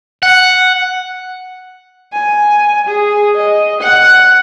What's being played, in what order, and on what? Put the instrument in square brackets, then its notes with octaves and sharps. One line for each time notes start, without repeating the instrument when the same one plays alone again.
[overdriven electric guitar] F#5
[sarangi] G#5
G#4
D#5
F#5